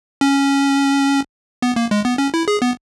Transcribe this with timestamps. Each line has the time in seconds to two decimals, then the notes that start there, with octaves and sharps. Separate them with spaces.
0.21 C#4
1.62 B3
1.76 A#3
1.91 G#3
2.05 B3
2.18 C#4
2.34 E4
2.48 G#4
2.62 B3